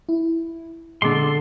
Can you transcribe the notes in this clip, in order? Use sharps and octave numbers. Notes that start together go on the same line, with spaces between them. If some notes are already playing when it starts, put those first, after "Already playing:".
E4
A#2 D3 G#3 A4 C6 D6